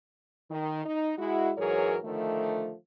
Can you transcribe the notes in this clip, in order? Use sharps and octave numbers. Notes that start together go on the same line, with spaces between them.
D#3
D#4
G#3 E4 F#4
G#2 E3 F#3 G#4 A#4 C#5
D3 D#3 F3 A3